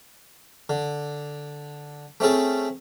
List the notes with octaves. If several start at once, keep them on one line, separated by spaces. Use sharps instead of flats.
D3
A3 C4 C#4 G#4 A4